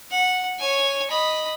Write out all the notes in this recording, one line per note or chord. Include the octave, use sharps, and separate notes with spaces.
F#5
C#5 G#5
D#5 B5